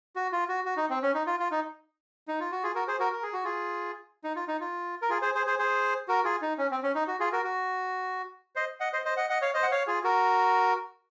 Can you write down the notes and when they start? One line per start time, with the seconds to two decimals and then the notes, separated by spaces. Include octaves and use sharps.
0.16 F#4
0.33 F4
0.49 F#4
0.65 F#4
0.77 D#4
0.90 C4
1.03 C#4
1.14 D#4
1.27 F4
1.40 F4
1.51 D#4
2.28 D#4
2.40 F4
2.52 F#4
2.63 F4 G#4
2.75 F#4 A#4
2.88 G#4 C5
3.00 F#4 A#4
3.13 A#4
3.23 G#4
3.33 F#4
3.44 F4 G#4
4.24 D#4
4.36 F4
4.48 D#4
4.60 F4
5.02 A#4
5.09 F4 G#4
5.22 G#4 C5
5.35 G#4 C5
5.46 G#4 C5
5.59 G#4 C5
6.08 F#4 A#4
6.25 F4 G#4
6.42 D#4
6.58 C#4
6.71 C4
6.83 C#4
6.95 D#4
7.08 F#4
7.20 F4 G#4
7.32 F#4 A#4
7.44 F#4
8.56 C5 D#5
8.80 D#5 F#5
8.93 C5 D#5
9.05 C5 D#5
9.17 D#5 F#5
9.30 D#5 F#5
9.42 C#5 F5
9.54 C5 D#5
9.63 F#5
9.72 C#5 F5
9.87 F4 G#4
10.04 F#4 A#4